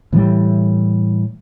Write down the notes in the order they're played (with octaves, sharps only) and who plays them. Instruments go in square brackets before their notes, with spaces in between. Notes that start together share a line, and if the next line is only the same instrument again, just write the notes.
[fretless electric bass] A2 E3 G3